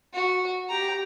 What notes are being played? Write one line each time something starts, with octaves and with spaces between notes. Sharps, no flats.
F#4
G4 A#5